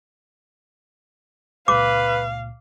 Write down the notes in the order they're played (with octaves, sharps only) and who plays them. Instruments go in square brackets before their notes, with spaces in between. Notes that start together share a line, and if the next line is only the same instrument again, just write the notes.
[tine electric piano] C#2 A#2 [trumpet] B4 [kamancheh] F5 [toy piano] D6